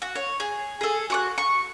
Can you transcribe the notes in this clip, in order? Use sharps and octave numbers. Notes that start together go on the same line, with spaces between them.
F#4
C#5
G#4
G#4 A4
F#4 C#6 F#6
C#6